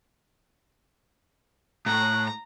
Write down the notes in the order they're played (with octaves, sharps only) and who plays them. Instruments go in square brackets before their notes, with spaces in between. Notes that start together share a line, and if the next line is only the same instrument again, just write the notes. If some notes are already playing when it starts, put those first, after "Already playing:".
[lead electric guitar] A2 [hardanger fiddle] A#5 [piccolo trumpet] F#6